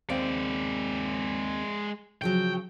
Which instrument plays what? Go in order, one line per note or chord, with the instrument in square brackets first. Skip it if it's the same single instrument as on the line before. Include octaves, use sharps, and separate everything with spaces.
[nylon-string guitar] D#2 C4 F5 [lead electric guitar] G#3 D5
[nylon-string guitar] C#3 F3 F#3 [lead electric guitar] G5